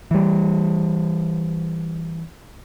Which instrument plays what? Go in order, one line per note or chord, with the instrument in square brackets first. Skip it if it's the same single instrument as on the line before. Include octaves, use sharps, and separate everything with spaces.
[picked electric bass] E3 G3